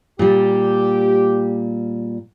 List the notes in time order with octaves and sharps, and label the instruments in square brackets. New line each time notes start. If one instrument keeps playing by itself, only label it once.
[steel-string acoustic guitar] A#2 G3 [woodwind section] G4